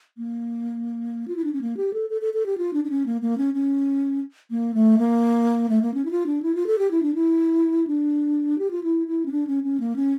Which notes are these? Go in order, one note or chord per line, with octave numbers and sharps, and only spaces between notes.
A#3
F4
E4
D4
C#4
A#3
G4
A4
A4
A4
A4
G4
F4
D4
D4
C#4
A#3
A#3
C#4
C#4
A#3
A3
A#3
A3
A#3
C#4
E4
F4
D4
E4
F4
A4
G4
E4
D4
E4
D4
G4
F4
E4
E4
C#4
D4
C#4
C#4
A#3
C#4